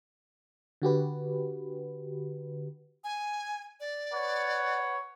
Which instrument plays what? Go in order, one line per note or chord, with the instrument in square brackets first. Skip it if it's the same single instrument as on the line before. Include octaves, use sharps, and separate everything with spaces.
[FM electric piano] D3 F#4 G4 B4
[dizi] G#5
D5
[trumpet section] B4 C#5 F#5